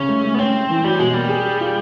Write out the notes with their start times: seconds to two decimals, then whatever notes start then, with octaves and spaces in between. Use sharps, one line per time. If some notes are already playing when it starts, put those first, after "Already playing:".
Already playing: C#3 C#4
0.08 A3
0.24 A3
0.34 B3
0.39 C4 C#4
0.54 A3
0.69 E3
0.84 F#3 G3
0.99 B2 G#3
1.14 G3 A#3
1.29 G#4
1.46 G#4
1.61 F4